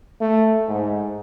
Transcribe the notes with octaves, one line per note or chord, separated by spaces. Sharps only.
A3
G#2